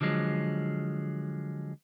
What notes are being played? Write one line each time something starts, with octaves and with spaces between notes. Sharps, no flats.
D3 F3 F#3 G#3